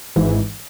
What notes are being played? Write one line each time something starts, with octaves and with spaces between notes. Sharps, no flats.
G#1 G#2 E3